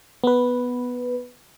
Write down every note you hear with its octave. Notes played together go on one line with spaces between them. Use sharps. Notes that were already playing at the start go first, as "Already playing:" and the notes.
B3 B4